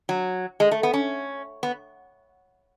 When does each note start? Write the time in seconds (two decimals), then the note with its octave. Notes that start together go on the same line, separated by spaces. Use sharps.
0.09 F#3
0.60 G#3
0.71 A3
0.83 B3
0.94 C#4
1.63 B3